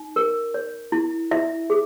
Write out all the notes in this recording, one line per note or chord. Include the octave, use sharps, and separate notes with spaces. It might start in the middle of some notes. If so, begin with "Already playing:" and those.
Already playing: D#4
A#4
C#5
E4
E4 E5
G#4